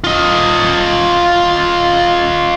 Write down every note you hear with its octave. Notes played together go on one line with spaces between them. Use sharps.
F4 D#5